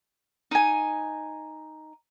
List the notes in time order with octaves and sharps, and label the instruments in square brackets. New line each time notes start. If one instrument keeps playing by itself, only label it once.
[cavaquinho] D#4 G#5